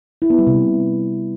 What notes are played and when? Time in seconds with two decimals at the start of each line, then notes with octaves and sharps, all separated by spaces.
0.22 E4
0.30 B3
0.39 G3
0.47 C3